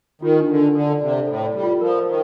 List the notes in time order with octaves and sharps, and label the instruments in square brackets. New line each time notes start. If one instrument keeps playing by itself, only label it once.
[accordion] D#3 [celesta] F4
[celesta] D4
[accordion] D3
[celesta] D4
[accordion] D3 [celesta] A4
[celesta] D5
[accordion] C3
[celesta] D5
[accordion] A2 [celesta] A4
[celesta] D5
[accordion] G3
[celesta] F4
[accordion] F3 [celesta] A#4
[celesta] F5
[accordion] D#3